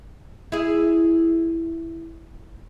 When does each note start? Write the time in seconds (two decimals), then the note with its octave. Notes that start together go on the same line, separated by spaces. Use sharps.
0.52 E4 G#4